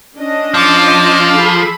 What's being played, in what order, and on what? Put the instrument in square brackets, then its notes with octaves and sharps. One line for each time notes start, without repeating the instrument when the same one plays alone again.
[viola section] C#4 D4 D#5
[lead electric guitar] F3 [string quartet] A5 D6
[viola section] G#4 A4 B5